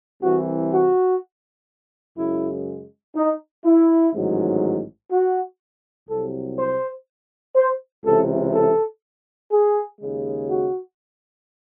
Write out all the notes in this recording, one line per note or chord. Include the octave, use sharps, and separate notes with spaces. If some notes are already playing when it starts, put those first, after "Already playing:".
C2 C3 E3 F#4
F#4
F#2 C#3 G#3 E4
D#4
E4
A1 G#2 D#3 F#3
F#4
C2 C3 F#3 A4
C5
C5
C#2 C3 E3 A4
A4
G#4
D#2 C#3 G#3
F#4